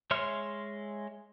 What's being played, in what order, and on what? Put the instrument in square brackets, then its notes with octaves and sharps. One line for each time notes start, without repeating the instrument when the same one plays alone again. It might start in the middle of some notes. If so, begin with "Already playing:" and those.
[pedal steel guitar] G#3 C#5 E5 C6 F6